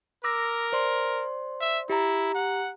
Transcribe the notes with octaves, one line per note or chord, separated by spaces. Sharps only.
A#4 D6 E6 A#6
C5 D5 C6
E5
E4 G4 A#5
F#5